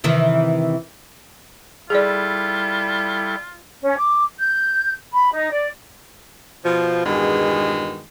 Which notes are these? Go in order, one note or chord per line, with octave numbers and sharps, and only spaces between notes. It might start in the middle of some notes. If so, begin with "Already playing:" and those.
C3 D#3 E3
G3 E4 F4 G#4 A4 D5
C#4
D6
G6
B5
D#4
D5
B2 F3
E2 G2 B2 D#3 G#3